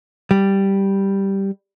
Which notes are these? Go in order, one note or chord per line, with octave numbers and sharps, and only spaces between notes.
G3